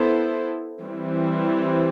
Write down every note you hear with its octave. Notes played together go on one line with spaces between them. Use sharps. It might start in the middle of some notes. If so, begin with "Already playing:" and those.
Already playing: B3 E4 A4 C5
E3 G3 C4